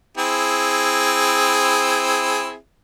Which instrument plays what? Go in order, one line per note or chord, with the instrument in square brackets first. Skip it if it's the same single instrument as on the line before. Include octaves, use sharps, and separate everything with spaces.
[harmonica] C4 E4 G#4